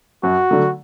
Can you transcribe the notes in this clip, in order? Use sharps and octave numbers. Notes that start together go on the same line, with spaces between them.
F#2 F#4
D3 F#3 A3